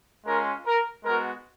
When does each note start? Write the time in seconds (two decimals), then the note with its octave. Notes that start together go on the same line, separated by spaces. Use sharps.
0.25 G#3 C#4 F4 A#4
0.66 A#4
1.04 G#3 B3 F#4 A#4